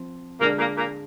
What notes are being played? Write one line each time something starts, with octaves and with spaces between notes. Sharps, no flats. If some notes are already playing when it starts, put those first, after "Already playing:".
Already playing: F3 C4
A#2 D3 G#3 A#3 D4
A#2 A#3
A#2 A#3